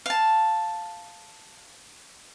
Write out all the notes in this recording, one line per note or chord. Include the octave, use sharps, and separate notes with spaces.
F5 A5